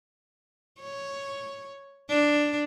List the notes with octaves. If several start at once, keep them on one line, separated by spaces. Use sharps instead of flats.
C#5
D4